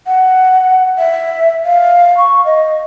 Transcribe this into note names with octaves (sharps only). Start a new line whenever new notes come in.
F#5
E5
F5
C#6
D#5